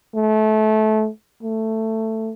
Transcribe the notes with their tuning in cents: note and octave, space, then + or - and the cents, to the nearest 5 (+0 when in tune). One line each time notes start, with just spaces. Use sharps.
A3 -25
A3 +10